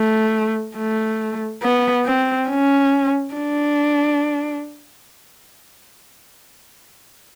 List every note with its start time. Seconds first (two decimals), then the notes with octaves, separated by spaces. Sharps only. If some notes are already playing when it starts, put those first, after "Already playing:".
Already playing: A3
0.77 A3
1.63 B3
2.06 C4
2.49 C#4
3.34 D4